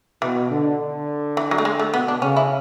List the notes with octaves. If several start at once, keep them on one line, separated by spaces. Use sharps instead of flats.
B2 E3
D3
D3
E3
F#3
A3
G#3
A3
B2 B3
D4
C#3 C#4
E4